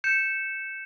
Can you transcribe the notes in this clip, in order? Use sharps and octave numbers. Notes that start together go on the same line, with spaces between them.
G6 C#7 E7